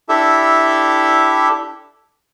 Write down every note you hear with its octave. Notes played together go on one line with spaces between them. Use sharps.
D4 E4 G4 A4 E5